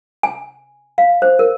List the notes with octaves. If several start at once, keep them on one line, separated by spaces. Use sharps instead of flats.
G#5
F5
C5
A#4